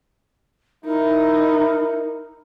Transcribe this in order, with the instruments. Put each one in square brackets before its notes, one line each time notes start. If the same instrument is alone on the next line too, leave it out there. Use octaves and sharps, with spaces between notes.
[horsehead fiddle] D#4 [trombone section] E4 [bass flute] A#4